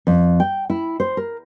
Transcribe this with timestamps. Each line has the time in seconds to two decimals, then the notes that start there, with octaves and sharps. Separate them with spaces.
0.07 F2
0.40 G5
0.70 E4
1.00 C5
1.17 A#4